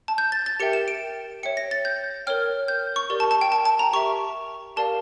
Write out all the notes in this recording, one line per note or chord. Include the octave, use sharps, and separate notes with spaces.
A5
G6
A6
A6
G4 A#4 E5 G5 C#7
E7
D7
C#5 E5 G5 C#7
A#6
A6
G6
A#4 C#5 G5 F6
G6
C#6
G4 A#4 D5
A5
A5
G5
A5
A5
A#5
G4 A#4 E5 C#6
G4 A#4 D5 F5 A5